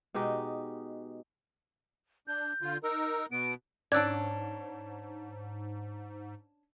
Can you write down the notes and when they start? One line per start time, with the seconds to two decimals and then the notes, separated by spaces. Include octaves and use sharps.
0.14 B2 G#3 D#4 G4
2.27 D4 G6
2.62 D3 F4
2.83 D#4 A#4 E6
3.32 B2 B3 D7
3.92 G#2 C#4 D4 D5 E6 F#6 G#6